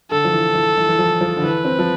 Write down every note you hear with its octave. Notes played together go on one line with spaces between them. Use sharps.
D3 A4
F3
E3
E3
E3
E3
F3
F3
D3
E3 B4
C4
F3